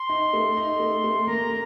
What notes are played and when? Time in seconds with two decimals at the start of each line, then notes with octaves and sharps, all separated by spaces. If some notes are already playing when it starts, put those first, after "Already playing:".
Already playing: C6
0.09 D#4
0.33 A3
0.57 D#4
0.80 A3
1.04 A3
1.27 A#3 A#5
1.50 A#3